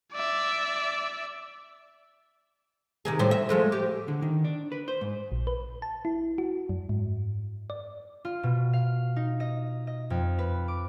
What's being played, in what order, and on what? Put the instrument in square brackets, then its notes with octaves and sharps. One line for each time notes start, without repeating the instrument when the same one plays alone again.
[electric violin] D5 E5
[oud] C3 D#3 G#4
A2 G3 C5
E2 E5
F3 G#3 A3
G4
[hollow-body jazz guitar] D3
D#3
D4
B4
C5
G#2
[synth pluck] A#1
B4
A5
E4
F#4
F#2
G#2
D5
[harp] F4
B2
F5
D#4
D#5
D#5
F2
B4
D6